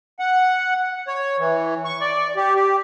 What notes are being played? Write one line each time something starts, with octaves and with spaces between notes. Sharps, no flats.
F#5
C#5
E3
C#6
D5
G4
G4